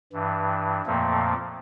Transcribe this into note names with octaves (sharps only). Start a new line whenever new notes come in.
G2 E3
F2 A#2 F3 A3 A#3